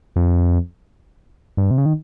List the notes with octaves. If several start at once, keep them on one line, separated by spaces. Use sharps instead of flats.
F2
G2
C3
C#3
D#3